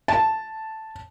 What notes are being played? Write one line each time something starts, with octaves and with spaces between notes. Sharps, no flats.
A5